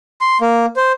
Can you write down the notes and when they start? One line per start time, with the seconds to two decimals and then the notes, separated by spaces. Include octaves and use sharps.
0.21 C6
0.41 A#3
0.76 C5